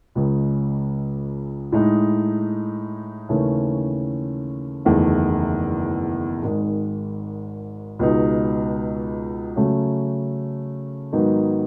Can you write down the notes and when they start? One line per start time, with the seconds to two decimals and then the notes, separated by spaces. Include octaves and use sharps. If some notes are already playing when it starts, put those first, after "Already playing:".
0.15 C#2 C#3 G#3
1.72 A2 G#3 D#4
3.29 D#2 C#3 E3 A3 C#4
4.85 F#1 E2 D#3 A3
6.42 G#1 G#2 D#3 G#3
7.99 C#2 B2 G#3 D#4
9.56 C#3 F#3 A3 C#4
11.13 G#2 D#3 F#3 B3 D#4